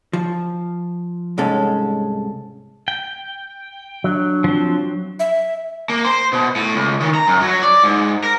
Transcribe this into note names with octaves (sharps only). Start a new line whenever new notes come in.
F3
C2 G#2 G#3 C#4 A4
G5
F#3 D4
F3 C4
E5
A#3
C5
B2
A2
C#2
D#3
A#5
F#2
F#3
D5
G#2
A#4